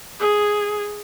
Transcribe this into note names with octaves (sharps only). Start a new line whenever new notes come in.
G#4